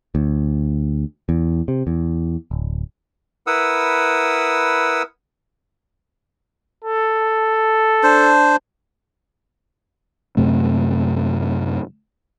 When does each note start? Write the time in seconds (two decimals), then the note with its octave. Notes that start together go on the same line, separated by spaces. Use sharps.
0.15 D2
1.29 E2
1.68 C3
1.87 E2
2.51 D1
3.47 E4 A#4 B4 F#5 D#6 E6
6.84 A4
8.03 D4 C5
10.37 F#2 C3 A3